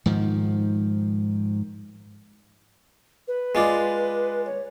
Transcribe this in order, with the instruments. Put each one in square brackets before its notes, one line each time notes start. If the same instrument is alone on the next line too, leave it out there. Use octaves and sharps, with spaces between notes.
[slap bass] G#2 D#3 F3
[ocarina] B4
[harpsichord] G#3 F4 D5
[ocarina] C#5